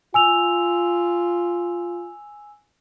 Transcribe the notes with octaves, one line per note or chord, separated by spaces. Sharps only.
F4 G#5 E6 F7